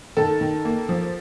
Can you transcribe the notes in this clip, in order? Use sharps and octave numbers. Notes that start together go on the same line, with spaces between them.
D#3 A4
D#3
A#3
F3